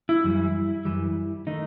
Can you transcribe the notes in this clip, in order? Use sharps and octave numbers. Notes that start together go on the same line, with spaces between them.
E4
F#2 E3 G3
F#2 E3 G3
D#3 A3 D#4